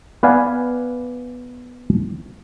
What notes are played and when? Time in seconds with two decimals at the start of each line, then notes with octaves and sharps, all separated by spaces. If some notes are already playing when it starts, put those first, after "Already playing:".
0.23 B3 B4 D5 F5 G#5